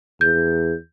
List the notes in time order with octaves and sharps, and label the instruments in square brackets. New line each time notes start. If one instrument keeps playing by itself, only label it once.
[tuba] E2 [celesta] G6